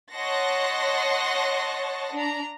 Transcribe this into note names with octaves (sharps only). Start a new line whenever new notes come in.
C#5 D#5 F#5 A5 C6 A#6
D4 A#5